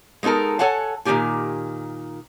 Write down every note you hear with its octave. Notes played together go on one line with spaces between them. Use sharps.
G#3 B3 D#4 A4 A#4
A4 C#5 F#5 G#5 A5
A#2 D#3 C#4 F4 G4 G#5